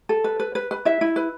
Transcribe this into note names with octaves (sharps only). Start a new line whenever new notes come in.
A4
B4
B4
B4
B4
E4 E5
E4
B4